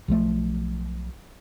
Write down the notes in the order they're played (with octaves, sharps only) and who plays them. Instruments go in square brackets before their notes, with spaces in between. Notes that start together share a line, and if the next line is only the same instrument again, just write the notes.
[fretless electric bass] B1 F3 A3